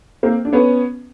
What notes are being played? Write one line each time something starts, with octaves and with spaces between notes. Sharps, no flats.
A#3 C4
D4
B3 C#4